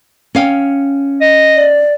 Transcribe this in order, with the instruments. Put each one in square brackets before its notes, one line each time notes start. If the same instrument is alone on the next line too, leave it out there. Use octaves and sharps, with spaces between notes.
[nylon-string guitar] C#4 F5 G5
[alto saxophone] D#5
[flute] D5